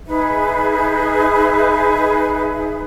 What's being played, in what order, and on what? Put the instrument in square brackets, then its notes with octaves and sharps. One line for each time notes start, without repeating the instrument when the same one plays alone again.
[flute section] D#4 G#4 B4 E5